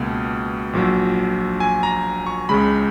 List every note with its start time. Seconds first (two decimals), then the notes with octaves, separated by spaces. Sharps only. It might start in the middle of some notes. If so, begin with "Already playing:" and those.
Already playing: C#2 B2 A#3
0.73 A#1 A#2 F#3
1.60 G#5
1.83 A#5
2.26 C#6
2.49 C#2 C#3 G#3 B5